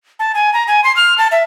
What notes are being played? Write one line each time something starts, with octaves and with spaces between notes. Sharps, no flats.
A5
G#5
A#5
G#5
C6
F6
A5
E5